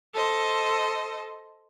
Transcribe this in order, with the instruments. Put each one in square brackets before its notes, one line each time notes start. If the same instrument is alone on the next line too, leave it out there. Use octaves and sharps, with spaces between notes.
[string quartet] A4 C5 D#5